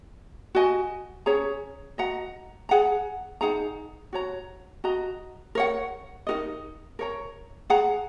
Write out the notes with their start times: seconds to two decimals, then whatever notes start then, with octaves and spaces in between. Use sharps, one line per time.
0.55 F#4 D#5 G#5
1.26 C#4 G#4 C#5 A#5
1.98 F#4 D#5 F#5 A#5
2.69 G#4 F#5 A#5
3.41 D#4 G#4 F#5 A#5
4.13 F#4 C#5 A#5
4.84 F#4 D#5 A#5
5.55 A#4 C#5 F#5
6.27 D#4 F#4 A#4 D#5
6.99 A#4 C#5 A#5
7.70 G#4 F#5 A#5